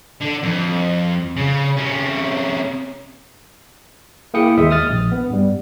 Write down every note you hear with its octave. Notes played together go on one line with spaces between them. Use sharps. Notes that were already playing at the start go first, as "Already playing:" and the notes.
D3
F2
C#3
C3 C#4
A#3 E4 G#4 G5 D#6 C#7
D#2 G#3 E5 D#6
D#6 F6 A6
A#1
B3
G2 G3